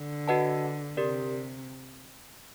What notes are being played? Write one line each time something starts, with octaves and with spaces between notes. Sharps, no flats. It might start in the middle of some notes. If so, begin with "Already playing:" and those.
Already playing: D3
F#4 B4 D#5 F#5 A5
C3 G4 A#4 D5